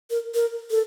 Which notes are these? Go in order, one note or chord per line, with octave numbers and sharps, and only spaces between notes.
A#4
A#4
A4